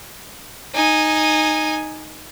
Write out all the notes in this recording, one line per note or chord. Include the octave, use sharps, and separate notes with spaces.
D#4 G#5